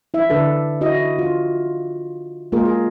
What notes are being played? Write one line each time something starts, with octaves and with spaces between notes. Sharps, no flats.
E4 E5
D3 D4 A4 B4
E4 F#4 D#5
F4
G#3 A#3 F4 G#4 A#4
G#4